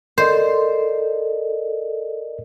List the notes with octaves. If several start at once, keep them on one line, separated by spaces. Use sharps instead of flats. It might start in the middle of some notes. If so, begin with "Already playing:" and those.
A4 A#4 C5 D5 D#5